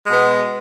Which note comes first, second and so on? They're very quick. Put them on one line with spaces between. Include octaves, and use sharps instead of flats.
G#3 B2 B3